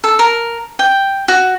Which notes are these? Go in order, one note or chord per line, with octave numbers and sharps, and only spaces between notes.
A4
A#4
G5
F#4